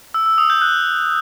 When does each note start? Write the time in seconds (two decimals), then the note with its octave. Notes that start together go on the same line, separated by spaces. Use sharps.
0.14 E6
0.26 E6
0.38 D#6
0.50 G6
0.62 F#6